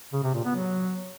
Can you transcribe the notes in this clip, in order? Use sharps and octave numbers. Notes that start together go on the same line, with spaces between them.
C#3
C3
A#2
B3
F#3